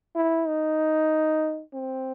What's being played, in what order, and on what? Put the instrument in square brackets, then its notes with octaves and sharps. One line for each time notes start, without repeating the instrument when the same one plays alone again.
[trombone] E4
D#4
C4